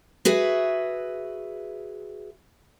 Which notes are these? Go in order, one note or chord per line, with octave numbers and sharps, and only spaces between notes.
F#4 G#4 B4 E5